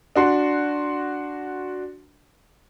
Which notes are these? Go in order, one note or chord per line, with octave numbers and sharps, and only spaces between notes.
D4 F#4 C6